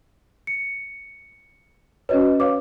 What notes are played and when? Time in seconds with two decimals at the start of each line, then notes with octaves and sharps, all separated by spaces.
0.47 C#7
2.09 C#4 F#4 B4 C#5 D#5
2.40 B4 C#5 F5 D6